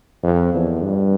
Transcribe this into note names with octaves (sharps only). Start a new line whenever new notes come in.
F2
E2
G2